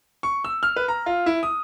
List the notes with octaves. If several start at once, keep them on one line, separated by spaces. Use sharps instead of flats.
C#6
E6
F6
B4
A#5
F4
E4
D#6